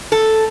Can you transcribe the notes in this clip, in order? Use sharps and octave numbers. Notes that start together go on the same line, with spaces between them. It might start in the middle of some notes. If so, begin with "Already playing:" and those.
A4